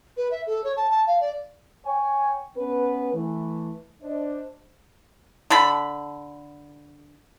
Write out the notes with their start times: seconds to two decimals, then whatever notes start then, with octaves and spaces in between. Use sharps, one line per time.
0.17 B4
0.31 E5
0.46 A4
0.64 C#5
0.76 A5
0.90 A5
1.07 F5
1.20 D5
1.85 C#5 G5 G#5
2.57 B3 C#4 B4
3.14 E3 A3
4.03 D4 C5 D#5
5.50 D3 A4 B5